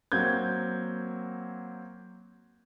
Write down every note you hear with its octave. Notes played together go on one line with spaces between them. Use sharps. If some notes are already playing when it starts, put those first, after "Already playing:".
F#3 A#3 C4 G6 G#6